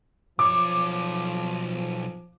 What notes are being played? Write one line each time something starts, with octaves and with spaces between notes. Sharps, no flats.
B1 F3 C#5 D6